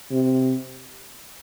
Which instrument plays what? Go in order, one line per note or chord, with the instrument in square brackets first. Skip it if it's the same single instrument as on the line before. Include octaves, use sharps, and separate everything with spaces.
[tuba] C3